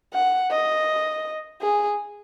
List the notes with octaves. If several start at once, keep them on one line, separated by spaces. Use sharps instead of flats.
F#5
D#5
G#4